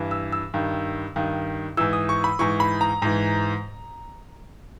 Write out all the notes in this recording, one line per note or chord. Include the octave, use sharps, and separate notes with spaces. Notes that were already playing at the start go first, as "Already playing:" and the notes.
Already playing: G2 E3
E6
E6
G2 D#3
G2 D#3
G#2 E3 E6
D#6
C#6
B5
G#2 E3 C#6
B5
A#5
G#2 E3